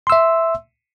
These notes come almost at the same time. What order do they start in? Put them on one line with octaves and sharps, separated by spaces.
C6 E6 E5